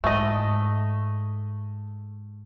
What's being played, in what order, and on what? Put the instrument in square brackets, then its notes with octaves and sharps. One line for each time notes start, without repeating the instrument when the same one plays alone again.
[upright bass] G#2 [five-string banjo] A3 D#5